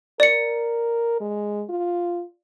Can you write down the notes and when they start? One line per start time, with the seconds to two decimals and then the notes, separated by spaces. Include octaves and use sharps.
0.20 A#4 D5 C#7
1.21 G#3
1.69 F4